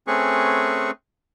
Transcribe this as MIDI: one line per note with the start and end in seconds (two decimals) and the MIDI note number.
0.07 0.91 57
0.07 0.91 60
0.07 0.91 61
0.07 0.91 68
0.07 0.91 71
0.07 0.91 85